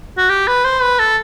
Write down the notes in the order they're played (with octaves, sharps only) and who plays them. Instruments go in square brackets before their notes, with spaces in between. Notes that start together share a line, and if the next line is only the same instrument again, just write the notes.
[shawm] F#4
G4
B4
C5
B4
A4